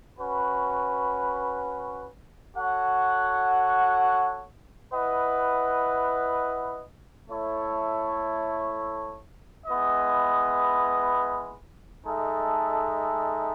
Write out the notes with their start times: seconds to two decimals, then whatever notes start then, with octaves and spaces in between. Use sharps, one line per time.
0.18 C#4 F#4 B4
2.55 F#4 A4 C#5 F#5
4.92 E4 B4 D#5 F#5
7.29 A3 E4 A4 C#5
9.67 G#3 B3 E4 B4 D#5
12.04 G#3 D#4 A4 E5